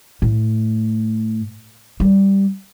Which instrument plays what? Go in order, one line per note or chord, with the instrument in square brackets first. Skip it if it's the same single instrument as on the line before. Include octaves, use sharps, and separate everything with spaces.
[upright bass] A2
G3